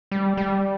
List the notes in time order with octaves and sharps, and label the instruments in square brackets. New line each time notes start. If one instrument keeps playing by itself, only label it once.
[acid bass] G3
G3